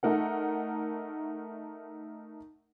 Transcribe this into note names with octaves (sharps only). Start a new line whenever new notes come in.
A3 D#4 A#4 F#5